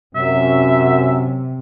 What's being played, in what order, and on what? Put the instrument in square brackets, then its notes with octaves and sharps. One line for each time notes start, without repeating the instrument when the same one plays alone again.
[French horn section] F#2 [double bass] C3 [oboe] E5